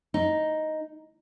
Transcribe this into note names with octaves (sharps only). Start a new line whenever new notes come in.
D#4